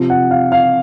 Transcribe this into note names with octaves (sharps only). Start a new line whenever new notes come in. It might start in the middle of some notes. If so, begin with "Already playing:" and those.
Already playing: C3 F3
F#5
F5
F5